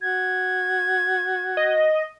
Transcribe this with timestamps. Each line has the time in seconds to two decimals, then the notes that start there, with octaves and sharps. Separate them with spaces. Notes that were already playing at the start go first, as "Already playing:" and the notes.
0.02 F#4 G#6
1.57 D#5